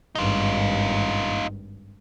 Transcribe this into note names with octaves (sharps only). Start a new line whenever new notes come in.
G#1 G2 D#4 F4